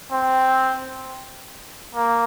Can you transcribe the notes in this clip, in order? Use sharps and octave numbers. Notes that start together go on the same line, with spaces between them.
C4
A#3